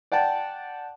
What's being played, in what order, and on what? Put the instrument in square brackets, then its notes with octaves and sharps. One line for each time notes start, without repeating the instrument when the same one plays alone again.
[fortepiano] D5 F#5 G5 A5